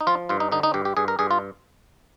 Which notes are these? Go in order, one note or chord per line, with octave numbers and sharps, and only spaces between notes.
D#4
F3 F4
G2 F4
D#4
D3 D#4
D#4
G2 G4
G4
G2 G#4
A#4
G2 G#4
F4